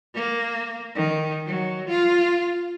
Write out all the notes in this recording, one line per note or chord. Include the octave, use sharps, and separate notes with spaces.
A#3
D#3
F#3
F4